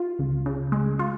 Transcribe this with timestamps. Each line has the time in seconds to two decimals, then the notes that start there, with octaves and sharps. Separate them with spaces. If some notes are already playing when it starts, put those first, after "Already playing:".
Already playing: F4
0.19 C#2
0.46 C#3
0.72 G#3
0.99 F4